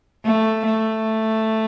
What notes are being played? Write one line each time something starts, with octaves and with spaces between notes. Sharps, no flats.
A3
A3